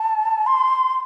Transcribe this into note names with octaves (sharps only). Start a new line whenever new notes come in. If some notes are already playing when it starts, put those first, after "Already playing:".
Already playing: A5
C6